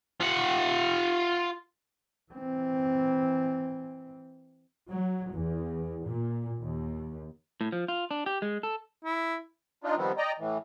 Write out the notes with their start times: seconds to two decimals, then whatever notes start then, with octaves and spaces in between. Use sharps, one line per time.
0.21 F4 F#5
2.32 E3 C4
4.90 F#3
5.33 E2
6.05 A#2
6.62 D#2
7.61 A2
7.72 F3
7.88 F4
8.11 D4
8.26 G4
8.42 G#3
8.63 A4
9.05 E4
9.84 D4 D#4 F4
9.97 D#3 F3 G3 B3 C4
10.18 D5 D#5 G5 A#5
10.39 A2 E3